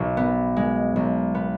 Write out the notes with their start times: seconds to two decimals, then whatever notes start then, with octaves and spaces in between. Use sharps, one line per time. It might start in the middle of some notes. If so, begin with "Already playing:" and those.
Already playing: B1
0.17 B3
0.57 G#3
0.96 B1
1.35 B3